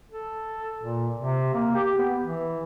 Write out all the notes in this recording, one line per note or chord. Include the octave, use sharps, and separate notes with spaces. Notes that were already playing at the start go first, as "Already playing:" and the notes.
A4
A#2
C3
A#3
G4
B3
E3